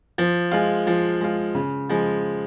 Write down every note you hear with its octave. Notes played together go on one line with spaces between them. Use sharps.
F3
G#3 F4
F3
G#3 F4
C#3
F3 G#3